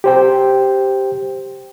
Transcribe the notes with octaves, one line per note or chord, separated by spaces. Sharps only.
G4 C5 G5